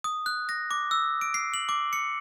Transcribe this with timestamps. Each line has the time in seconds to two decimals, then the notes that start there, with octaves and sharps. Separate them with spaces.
0.04 D#6
0.26 F#6
0.49 A#6
0.71 D6
0.91 E6
1.21 D7
1.34 C7
1.54 F#7
1.69 D6
1.93 C#7